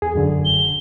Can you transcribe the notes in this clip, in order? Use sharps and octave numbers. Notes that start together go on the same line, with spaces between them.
E2 G#4
F#2 D3
E1
E1 G7